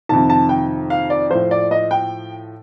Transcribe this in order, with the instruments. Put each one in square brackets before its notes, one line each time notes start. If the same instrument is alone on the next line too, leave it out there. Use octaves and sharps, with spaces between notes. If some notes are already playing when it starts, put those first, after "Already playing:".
[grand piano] F2 C3 D#3 A5
A5
G5
F5
D5
A2 F3 C5
D5
D#5
G5